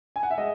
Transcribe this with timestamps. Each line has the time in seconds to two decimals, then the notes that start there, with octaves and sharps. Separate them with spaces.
0.16 G#5
0.23 F#5
0.31 E5
0.38 G#3 D#5